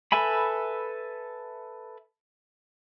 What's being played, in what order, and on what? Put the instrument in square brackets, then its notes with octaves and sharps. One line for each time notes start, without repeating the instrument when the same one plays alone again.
[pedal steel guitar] A4 B4 E5 G#5 B5